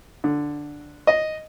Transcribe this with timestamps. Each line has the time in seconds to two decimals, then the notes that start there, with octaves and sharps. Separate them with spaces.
0.24 D3
1.07 D#5